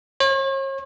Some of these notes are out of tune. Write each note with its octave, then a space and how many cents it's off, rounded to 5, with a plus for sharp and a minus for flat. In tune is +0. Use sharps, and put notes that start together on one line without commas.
C#5 -40